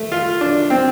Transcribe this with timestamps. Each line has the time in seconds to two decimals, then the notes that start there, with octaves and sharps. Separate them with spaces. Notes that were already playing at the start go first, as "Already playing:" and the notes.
Already playing: A3
0.12 F4
0.41 D4
0.70 C4